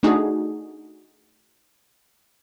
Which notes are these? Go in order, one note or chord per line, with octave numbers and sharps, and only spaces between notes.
A3 D4 D#4 F#4 G#4